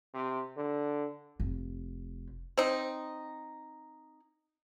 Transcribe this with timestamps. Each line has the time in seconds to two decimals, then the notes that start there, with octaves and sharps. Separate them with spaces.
0.14 C3
0.57 D3
1.40 F1
2.57 C4 D#4